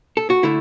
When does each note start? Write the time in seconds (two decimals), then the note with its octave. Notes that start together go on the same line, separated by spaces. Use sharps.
0.17 A4
0.30 F#4
0.43 D3 A3 E4